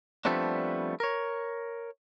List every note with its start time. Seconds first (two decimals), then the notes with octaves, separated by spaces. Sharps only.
0.25 F3 G3 A3 B3 C4 D4
1.00 A#4 C#5